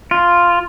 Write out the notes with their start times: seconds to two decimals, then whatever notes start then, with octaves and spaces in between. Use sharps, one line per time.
0.11 F4